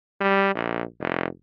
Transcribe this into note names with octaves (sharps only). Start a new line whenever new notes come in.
G3
A#1
F1